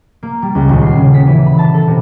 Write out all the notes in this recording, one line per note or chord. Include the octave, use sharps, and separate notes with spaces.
A#3
G3
C#2
D#1
C7
C#3
B6
E3
B5
A5
A4
C3